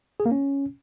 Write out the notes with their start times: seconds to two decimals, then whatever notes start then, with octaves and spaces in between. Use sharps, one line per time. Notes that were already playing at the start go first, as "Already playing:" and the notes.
0.20 G#4
0.26 A#3
0.31 C#4